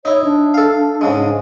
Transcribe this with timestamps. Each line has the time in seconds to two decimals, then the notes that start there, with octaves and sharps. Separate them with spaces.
0.05 D#4 E4 C#5
0.24 D4
0.54 A4 F5
1.01 G#2 C#3 G#3